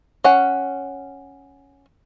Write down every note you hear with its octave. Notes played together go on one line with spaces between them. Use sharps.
C#4 F#5